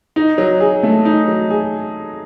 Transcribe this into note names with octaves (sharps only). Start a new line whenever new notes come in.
D#4
F#3
G#4
A3
D#4
F#3
G#4